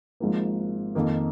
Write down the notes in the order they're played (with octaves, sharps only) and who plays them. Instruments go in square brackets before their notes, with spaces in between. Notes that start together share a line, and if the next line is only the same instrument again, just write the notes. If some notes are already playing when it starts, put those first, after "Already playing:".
[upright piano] G#1 G#2 F3 A#3
F2 D#3 A#3